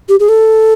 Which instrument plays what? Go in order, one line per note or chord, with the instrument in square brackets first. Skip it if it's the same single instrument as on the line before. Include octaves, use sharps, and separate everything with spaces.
[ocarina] G4
G#4
A4